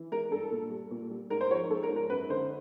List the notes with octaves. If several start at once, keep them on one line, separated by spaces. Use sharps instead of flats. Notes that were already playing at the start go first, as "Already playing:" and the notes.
Already playing: E3
G#3 A#4
G2 A4
A#2
G3
A#2
G3
G#2 A#4
C5
F3 C#5
G#3 A4
A#4
G#2
A#4
F#2 B4
D3 C5